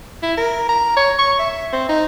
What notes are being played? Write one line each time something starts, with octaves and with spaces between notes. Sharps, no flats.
E4
A#4
A#5
C#5
C#6
E5
C4
D#4